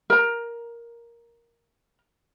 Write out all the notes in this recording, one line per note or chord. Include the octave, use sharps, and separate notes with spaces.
A#4 A#5